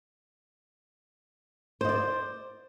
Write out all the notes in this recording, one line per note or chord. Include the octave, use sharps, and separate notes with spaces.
C5 D5 D#5